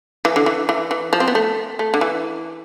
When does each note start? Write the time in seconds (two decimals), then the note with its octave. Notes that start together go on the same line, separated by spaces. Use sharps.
0.25 E3
0.36 D3
0.46 E3
0.69 E3
0.91 E3
1.13 F3
1.20 C4
1.28 B3
1.35 A3
1.79 A3
1.94 D3
2.01 E3